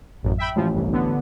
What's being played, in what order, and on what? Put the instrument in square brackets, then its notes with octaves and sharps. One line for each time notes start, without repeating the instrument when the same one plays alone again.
[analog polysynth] A1 F#2
E5 G5 B5
[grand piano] A1 [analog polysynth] F3
[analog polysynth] G1 C2
D3 B3